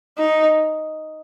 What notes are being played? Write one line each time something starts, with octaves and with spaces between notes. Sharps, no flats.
D#4